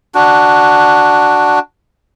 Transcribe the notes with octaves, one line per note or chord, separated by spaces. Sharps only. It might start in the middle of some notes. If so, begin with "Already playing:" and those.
D4 F#4